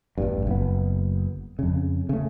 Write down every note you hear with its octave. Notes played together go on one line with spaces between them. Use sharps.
A1 E2 G2
F#1 B3
F2 C#3
C#3 A3